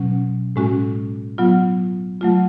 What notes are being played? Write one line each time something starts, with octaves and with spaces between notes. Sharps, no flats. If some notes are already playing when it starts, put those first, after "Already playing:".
Already playing: B2 F#3 C#4
A2 G#3 C#4 F#4
F#3 B3 F4
F#3 A3 F4